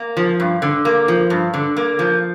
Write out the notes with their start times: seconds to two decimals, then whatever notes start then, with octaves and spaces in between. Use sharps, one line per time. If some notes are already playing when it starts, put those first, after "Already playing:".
Already playing: A#3
0.17 F3
0.40 G2
0.62 D3
0.85 A#3
1.08 F3
1.30 G2
1.54 D3
1.77 A#3
1.99 F3